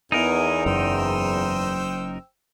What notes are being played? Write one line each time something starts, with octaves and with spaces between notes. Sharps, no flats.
E2 B3 D#4 E4 A#4 G#5
F#1 F#2 C5 G5 E6